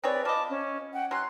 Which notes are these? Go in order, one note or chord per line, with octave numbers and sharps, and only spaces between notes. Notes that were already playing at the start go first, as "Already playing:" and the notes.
C4 G#4 B4 C#5 D5
F3 D#5 A5 B5 D6
C#4
F#5 G5
F#3 C#4 C6 F#6